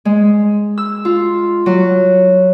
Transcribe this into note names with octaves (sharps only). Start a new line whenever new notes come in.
G#3
E6
F4
F#3